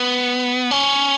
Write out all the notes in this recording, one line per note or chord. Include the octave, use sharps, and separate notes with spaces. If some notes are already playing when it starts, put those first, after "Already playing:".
Already playing: B3
C#4